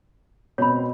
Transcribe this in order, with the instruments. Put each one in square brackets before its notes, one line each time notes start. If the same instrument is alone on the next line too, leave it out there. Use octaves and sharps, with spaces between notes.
[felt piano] B2 C4 [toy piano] C#5 B5